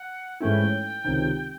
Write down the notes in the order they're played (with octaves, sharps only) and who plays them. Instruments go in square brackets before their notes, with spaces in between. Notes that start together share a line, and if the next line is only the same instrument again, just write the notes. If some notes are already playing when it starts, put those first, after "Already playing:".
Already playing: [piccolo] F#5
[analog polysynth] G#2 E3 A3 C#4 E4 [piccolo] G5
[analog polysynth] C#2 C3 D#3